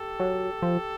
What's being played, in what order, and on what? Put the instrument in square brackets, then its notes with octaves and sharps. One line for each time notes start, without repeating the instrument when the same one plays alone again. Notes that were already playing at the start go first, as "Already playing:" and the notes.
Already playing: [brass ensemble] G4 A4
[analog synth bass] F#3
F3